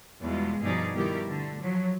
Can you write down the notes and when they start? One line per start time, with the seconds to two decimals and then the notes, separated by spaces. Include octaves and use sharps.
0.21 E2 B2 G3 G#3 F4
0.61 G2 B2 F3 D#4 G#4 D5
0.94 B2 D#3 G3 E4 G4 A#4
1.27 D3 A3
1.60 F3 F#3